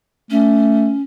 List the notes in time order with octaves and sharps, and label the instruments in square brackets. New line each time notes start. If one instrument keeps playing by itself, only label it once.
[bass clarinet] A3 [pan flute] C#4